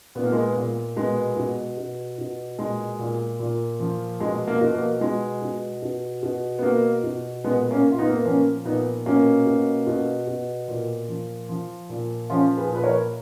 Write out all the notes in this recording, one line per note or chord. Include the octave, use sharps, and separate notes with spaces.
A#2 B3
A#3
G#3 B3
A#2
B2 G#3 B3
B2
B2
B2
A#2 G#3
A#2
A#2
F3
B2 G#3
A#3
B2
A#3
B2 G#3
B2
B2
B2
B3
B2 A#3
B2
A#2 G#3 B3
A#3 C#4
A#2
F4
B3 D#4
A#3
B3
F3 A#3 C#4
A#2 B3 D#4
B2 A#3 C#4
B2
B2
B2
A#2
F3
F3
A#2
F3 C#4 F4
G#4 B4
A#2 B4
A#4 C#5